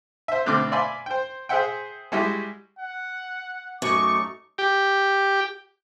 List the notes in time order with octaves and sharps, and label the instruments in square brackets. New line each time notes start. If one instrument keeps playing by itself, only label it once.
[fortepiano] C5 E5
B2 D3 A3 C4 D6 F6
D5 E5 F5 G#5 B5 C6
C5 G5
G#4 C5 E5 F#5 G5
G3 G#3 E4 F#4 G4
[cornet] F#5
[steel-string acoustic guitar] F#2 [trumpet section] A3 D#4 D6 [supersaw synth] C#6
[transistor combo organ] G4